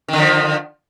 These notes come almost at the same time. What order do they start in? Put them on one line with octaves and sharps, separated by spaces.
D#3 D3 F3